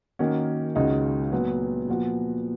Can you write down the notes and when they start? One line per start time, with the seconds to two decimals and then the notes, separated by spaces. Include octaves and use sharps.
0.19 D#3 A#3 C#4 F#4
0.76 C#2 C#3 G#3 D#4 F#4
1.32 A#2 F#3 B3
1.88 A#2 F3 B3 F#4